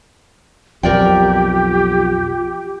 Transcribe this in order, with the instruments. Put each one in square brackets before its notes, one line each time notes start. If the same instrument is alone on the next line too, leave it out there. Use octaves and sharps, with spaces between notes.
[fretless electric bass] B1 F2 [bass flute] F4 [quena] G4 [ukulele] A#4 D5 G5